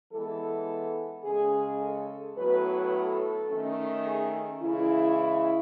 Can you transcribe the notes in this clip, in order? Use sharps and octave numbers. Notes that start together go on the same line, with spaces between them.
E3 G#3 B3 A4
C#3 G#3 C#4 G#4
A4
A2 F#3 B3 B4
A4
D#3 A3 C#4
G#4
C#3 E3 G#3 E4